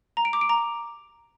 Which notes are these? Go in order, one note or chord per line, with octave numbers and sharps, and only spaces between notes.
A#5
D7
D6
D7
A#5